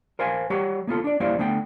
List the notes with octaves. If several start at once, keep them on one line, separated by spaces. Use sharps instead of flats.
A#4 C5 F5 G#5
G3 G4 C#5 F#5
A#3 B3 F4 A4
D4 D5
G3 A#3 E4 C5 D5 F5
D3 A3 B3 G5